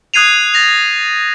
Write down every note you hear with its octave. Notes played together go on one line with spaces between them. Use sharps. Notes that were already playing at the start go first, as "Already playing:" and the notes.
D#6 F#6 G#6 C7 D#7 F7
A6 A#6 F7